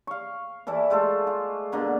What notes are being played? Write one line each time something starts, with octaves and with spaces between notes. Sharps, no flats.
F5 C#6
E3 E4 A4 D5
G#3 A3 F4 A4
F4
B2 D3 A#3